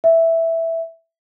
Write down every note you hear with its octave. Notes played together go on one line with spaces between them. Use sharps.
E5